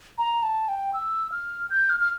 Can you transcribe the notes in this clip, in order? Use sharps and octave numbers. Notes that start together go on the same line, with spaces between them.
A#5
A5
G5
E6
F6
G6
F6
F6